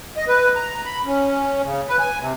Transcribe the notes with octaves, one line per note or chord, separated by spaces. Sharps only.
D#5
B4
A#5
B5
C#4
C#3
B4
G#5
C3